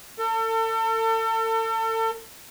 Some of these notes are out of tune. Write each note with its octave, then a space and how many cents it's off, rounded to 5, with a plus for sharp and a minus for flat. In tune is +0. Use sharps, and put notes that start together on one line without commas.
A4 +35